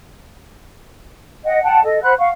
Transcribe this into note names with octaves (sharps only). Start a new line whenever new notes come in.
D#5 F#5 G5
F#5 G5 A5
A4 D#5
C5 F#5 B5 F#6
F5 F#5 C#6